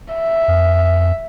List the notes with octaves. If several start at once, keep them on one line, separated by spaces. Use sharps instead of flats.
E5
F2